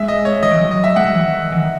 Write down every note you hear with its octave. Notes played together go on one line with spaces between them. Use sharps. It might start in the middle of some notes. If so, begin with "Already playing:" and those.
Already playing: G#3 E5
D#5
C#5
D#3 D#5
E3
F#3
D#5
E5
G#3 F#5
F#3
E3
D#3
E3
D#3